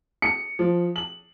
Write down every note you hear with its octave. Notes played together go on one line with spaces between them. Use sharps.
C#7
F3
F#7